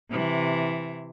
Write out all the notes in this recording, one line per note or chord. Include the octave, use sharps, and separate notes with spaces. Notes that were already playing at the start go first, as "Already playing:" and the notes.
C3 E3